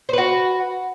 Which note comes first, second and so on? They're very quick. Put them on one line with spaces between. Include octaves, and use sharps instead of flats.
C5 B4 F#4